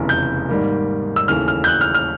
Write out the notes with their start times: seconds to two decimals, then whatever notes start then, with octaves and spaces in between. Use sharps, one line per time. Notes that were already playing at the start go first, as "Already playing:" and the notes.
Already playing: F1 E2 C#3 E3
0.09 G6
0.49 G#2 D#3 G3 A#3
1.16 E6
1.28 D#2 C#3 E3 A3 F6
1.48 F6
1.64 G6
1.68 F#6
1.81 F6
1.94 F6